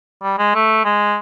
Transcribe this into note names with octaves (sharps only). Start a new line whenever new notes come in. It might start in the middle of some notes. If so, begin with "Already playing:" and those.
G3
G#3
A3
G#3